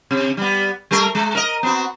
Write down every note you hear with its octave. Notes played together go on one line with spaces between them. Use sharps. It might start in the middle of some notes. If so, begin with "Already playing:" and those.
C3
G3 B3
G3 A3 A#4
G#3
A#4 D#5
B3 C4 F#4